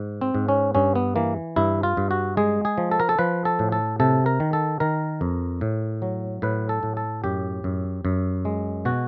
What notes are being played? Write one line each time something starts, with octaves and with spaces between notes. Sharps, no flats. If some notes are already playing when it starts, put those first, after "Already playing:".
Already playing: G#2
C4
G#2
C#4
G2 C#4
B3
E3 A#3
G2 E4
F4
G2
F#4
G#3 G#4
G#4
F3
A4
A#4
A4
F3 B4
A4
A2
A4
C3 A4
A#4
D#3
A4
D#3 A#4
F2
A2
F#3
A2 B4
A4
A2
A4
F#2 G4
F#2
F#2
G#3
B2 F#4